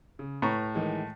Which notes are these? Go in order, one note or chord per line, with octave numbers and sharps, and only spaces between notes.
C#3
A2 B4 A#5 C#6
D#3 E3 G#3